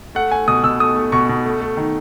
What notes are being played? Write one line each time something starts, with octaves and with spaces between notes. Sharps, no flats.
A3 F#5
A3 G#5
B2 D#6
B2 E6
A3 D#6
A3
B2 C#6
B2
A3
A3
D#3